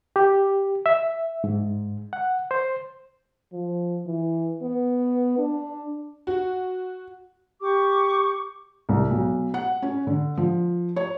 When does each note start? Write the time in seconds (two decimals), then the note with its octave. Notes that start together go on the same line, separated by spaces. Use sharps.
0.16 G4
0.86 E5
1.44 G#2
2.13 F#5
2.51 C5
3.53 F3
4.06 E3
4.62 B3
5.38 D4
6.27 F#4
7.62 G4 C#6 D6
8.89 C2
9.11 B1
9.54 F#5
9.82 C#4
10.07 D3
10.37 F3
10.96 C#5